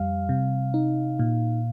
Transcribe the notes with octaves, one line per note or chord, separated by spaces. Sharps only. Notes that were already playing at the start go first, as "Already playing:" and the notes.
Already playing: F2 G3 F5
C3
D#4
A#2